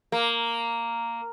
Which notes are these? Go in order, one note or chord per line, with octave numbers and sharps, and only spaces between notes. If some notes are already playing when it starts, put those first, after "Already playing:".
A#3